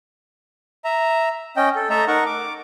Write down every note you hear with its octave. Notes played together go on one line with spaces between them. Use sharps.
E5 A#5
C#4 D#5 G5
A4
A3 A4 D#5 E5 A#5
D#4 A#4 F#5 C#6
D6